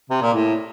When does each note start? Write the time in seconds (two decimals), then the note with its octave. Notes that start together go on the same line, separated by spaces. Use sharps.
0.10 C3
0.22 A#2
0.34 A2